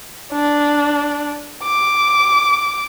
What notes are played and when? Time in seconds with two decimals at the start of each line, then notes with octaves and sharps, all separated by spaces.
0.32 D4
1.63 D6